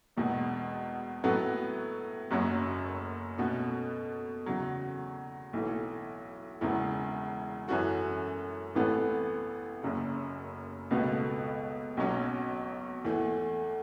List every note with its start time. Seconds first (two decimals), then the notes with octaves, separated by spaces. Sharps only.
0.17 E1 E2 B2
1.24 A2 F#3 B3 A4
2.31 F#1 F#2 F#3
3.38 B2 A3 C#4 F#4 A4
4.46 E2 C#3 F#3
5.53 B1 A2 E3
6.61 E1 E2 C#3 E3
7.68 F#2 E3 C#4 F#4 A4
8.75 A1 A2 E3 B3 A4
9.83 F#1 F#2 C#3
10.91 C#2 B2 B3 F#4 A4
11.97 B1 B2 F#3 C#4
13.05 E2 E3 A3